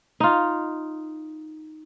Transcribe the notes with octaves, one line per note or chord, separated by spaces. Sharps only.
D#4 F4